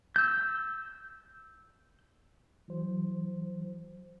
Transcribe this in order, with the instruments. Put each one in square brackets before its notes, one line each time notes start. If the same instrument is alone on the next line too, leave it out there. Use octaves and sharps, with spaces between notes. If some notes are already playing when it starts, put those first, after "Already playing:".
[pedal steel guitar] E6 G6
[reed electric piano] E3 F#3 C5